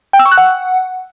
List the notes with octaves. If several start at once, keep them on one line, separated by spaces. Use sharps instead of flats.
G5
E6
C#6
F#6
F#5